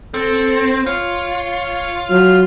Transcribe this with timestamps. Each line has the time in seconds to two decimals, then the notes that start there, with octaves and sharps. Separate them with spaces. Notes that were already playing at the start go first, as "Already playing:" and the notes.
0.14 C4 A4
0.86 F4 C#5
2.10 F#3 F6